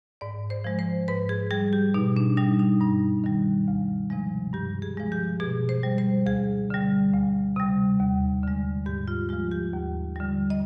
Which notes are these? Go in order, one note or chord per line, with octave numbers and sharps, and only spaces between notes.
G#2 D5
C5
F3 G#3
C5
G#2 B4
G#4
G3 G#4
G4
B2 D#4
D4
G3 D#4
D#4
G2 D#4
D#3 G3
D2
C3 F3 G#3
G2 G4
G#4
F3 G#3
G4
B2 G#4
C5
G3
C5
D2 G#4
D3 G3
D2
C3 G3
D#2
D3 G#3
G#2 G4
F4
F3 G#3 F4
G4
D#2
D3 G3
D#5